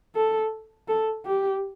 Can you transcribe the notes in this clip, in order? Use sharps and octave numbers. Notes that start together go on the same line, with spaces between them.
A4
A4
G4